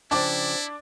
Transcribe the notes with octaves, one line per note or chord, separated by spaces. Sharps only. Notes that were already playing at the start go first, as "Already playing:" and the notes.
C#3 F3 D4 E4 D5 G5